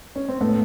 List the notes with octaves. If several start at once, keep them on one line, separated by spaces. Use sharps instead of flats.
C#4
C4
A2 A3 B3